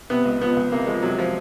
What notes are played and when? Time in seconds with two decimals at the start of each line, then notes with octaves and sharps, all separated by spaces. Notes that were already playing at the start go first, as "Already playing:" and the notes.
0.10 C3 B3
0.25 C#2
0.41 F3 B3
0.57 C#2
0.72 C3 A#3
0.87 F3 G#3
1.03 C3 F#3
1.18 F3